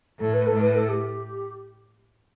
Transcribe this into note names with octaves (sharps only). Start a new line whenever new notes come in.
A2 A4
B4
A4
A2
B4
A4
G4